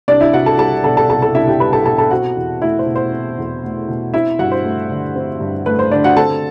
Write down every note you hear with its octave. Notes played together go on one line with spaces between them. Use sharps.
C2 D4 D5
E4 E5
C2 F#4 F#5
A4 A5
G3 A4 A5
B2 A4 A5
A4 A5
C2 A4 A5
A4 A5
C2 E4 E5
G4 G5
G3 B4 B5
A4 A5
B2 A4 A5
A4 A5
C4 F#4 F#5
E2
A3 E4 E5
C5
B2
C5
C4
E2
A3
B2
C4 E4 E5
G2 F#4 F#5
C5
A3
D3
C4
G2
A3 B4
C5
D3 D4 D5
F#4 F#5
C4 A4 A5